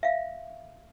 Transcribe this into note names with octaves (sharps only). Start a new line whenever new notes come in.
E5 F5